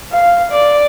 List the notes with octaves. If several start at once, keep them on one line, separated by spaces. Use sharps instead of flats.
F5
D5